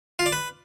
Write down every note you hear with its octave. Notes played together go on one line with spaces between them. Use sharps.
F4
D5
B4